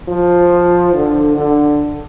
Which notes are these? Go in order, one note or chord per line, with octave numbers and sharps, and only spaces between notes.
F3
D3
D3